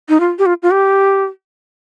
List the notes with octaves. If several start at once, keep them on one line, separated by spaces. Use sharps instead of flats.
D#4
F4
G4
F4
F4
G4